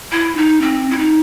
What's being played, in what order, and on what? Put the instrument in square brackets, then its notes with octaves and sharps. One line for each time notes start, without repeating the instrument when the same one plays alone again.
[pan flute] E4
D#4
C4
E4
D#4